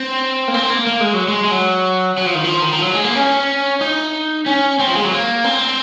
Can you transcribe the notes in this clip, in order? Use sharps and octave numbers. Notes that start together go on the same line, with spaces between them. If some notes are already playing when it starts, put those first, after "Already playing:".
Already playing: C4
A#3
C4
A#3
A#3
G#3
F#3
G#3
G#3
F#3
F#3
F3
D#3
F3
D#3
F3
F#3
G#3
A#3
C#4
D#4
C#4
C4
F3
G#3
F#3
A#3
C4